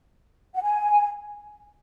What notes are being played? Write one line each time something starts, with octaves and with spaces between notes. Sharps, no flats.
F#5
G#5